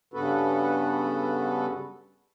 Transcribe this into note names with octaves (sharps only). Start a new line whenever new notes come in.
G2 C#3 B3 F#4 A4 B4